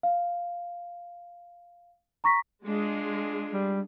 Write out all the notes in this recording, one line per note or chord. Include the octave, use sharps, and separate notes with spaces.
F5
A#5 C#6 A#6 B6
G#3 D4 F4 G#4
G3